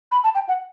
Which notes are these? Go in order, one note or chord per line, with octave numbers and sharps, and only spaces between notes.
B5
A5
G5
F#5